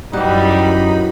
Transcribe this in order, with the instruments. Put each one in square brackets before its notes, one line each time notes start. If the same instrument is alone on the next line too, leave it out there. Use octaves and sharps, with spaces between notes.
[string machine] F#2 B5 [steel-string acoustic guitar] E3 F#3 [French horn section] G3 [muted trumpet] D#4